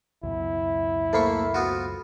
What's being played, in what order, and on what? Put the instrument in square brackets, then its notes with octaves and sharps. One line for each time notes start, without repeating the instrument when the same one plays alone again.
[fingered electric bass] C#2 F#2 B2 [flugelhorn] E4
[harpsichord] A3 A#3 C#6 [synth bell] A4 C5 B5
[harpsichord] B3 F4 F#4